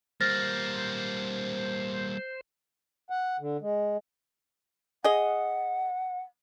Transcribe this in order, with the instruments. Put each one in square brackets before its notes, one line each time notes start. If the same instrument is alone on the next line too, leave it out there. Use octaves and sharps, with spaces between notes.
[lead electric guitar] G3 A#3 [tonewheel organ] C5 [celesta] F6 A6 A#6
[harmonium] F#5
D3
G#3
[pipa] G#4 D#5 [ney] F#5